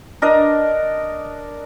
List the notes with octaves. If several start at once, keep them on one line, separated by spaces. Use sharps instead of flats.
D4 A#4 D#5